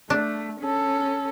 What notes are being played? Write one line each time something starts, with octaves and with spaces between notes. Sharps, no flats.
A3 D4
C#4 A4